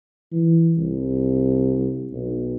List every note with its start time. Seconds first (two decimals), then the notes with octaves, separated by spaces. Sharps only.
0.32 E3
0.78 C2
2.12 B1